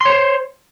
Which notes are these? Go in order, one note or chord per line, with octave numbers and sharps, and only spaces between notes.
C5 C#5 C6